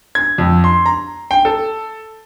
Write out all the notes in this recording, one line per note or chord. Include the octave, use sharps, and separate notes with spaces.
G#6
F2
C6
A#5
G5
A4